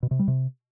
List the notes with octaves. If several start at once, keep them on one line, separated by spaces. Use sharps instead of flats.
B2
C3
G3
C3